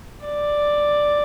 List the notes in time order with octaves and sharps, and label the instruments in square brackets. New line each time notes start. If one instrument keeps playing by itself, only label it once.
[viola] D5